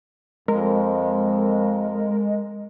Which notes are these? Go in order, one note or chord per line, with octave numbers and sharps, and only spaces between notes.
F2 G#3 A#4